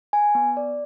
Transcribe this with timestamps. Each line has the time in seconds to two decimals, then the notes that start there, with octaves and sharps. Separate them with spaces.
0.13 G#5
0.35 B3
0.57 D5